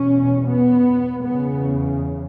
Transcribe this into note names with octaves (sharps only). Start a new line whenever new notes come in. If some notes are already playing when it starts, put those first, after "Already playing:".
Already playing: E2 B2 C#4
B3
E2 C#3 B3